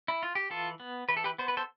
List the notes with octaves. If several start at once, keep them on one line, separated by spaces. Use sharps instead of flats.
E4
F4
G4
E3 F4 A4
B3
E3 B4
A4
G4 B4
B3 C5
B4
A4 C5